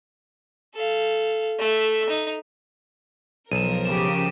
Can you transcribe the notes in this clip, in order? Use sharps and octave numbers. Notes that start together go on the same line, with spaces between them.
A4 F5
A3 E5
D#4
B1 F3 A#4 D#7 E7
C#3 G4 E7